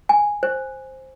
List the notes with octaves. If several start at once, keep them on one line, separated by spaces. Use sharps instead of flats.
G#5
C5